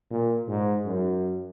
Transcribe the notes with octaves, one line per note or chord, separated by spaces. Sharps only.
A#2
G#2
F#2